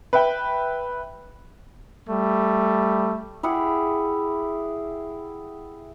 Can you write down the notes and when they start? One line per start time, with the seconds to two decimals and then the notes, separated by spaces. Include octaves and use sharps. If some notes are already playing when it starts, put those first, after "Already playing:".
0.13 B4 E5 G5
2.07 G3 A3
3.43 E4 G4 G#4 F#5